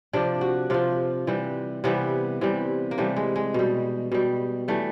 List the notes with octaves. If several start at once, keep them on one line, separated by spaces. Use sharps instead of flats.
C3 F3 D4
F#4
C3 F3 F4
C3 E3 G3
C3 E3 G3 B3
C3 E3 G3
A#3
C3 E3 G3 A3
G#3
G#3
B2 G3
B2 G3
E3 G3 A3